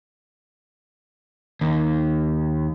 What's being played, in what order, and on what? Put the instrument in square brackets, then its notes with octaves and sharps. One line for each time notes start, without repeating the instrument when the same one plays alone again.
[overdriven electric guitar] D#2